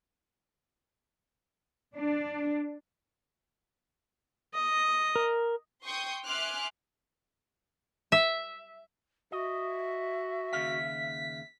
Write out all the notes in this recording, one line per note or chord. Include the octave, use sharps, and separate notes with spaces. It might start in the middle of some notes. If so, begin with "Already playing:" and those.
D4
D#5
A#4
G5 C6 C#6 D#6 G6
E5 G#5 C6 D6 F6 F#6
E5
F#4 D#5 E5
D#2 C#3 F5 B6